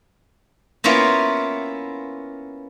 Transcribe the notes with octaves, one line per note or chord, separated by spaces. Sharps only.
A#3 B3 C#4 E4 F4